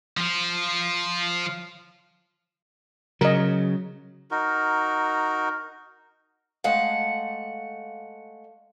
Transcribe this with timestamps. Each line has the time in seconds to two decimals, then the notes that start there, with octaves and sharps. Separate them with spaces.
0.17 F3 F4
3.21 C#3 F#3 A#4 D#5
4.31 D#4 F#4 A#4
6.64 G#3 A3 F5 F#5